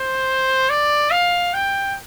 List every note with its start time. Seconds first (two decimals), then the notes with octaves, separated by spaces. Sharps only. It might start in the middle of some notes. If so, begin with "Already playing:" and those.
Already playing: C5
0.70 D5
1.11 F5
1.54 G5